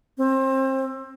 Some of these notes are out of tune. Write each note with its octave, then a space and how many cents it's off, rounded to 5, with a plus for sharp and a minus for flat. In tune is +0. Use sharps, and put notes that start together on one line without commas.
C4 +30